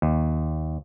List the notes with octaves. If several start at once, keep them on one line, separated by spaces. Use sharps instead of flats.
D#2